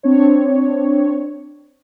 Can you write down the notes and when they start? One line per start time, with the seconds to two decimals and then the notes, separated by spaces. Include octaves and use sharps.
0.03 C4 D4 C#5